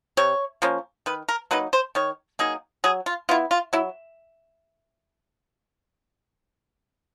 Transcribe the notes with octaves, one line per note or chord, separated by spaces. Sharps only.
C3 C#5
F3 A#3 C#4
D#3 B4
A#4
F#3 A#3 D#4 B4
C5
D#3 C#5
F#3 A#3 D#4 G#4
F#3 G#4
F4
B3 E4 F4
F4
F#3 E4